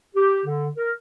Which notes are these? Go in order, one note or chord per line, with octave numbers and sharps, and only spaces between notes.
G4
D3
A#4